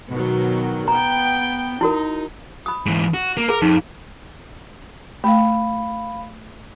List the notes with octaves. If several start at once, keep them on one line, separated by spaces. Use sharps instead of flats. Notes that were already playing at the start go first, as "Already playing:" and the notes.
B2 D#3 F#3
B3 G5 A#5
D#4 E4 F#4 A#4
B5 D#6
G#2 E3
F#4
A#3
G#4 A#4 B4
F2 D#4
A3 F5 B5